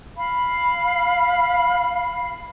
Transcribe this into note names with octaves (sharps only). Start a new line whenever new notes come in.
F5 B5